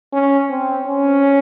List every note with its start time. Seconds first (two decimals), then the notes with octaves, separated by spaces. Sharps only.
0.13 C#4
0.50 C4
0.87 C#4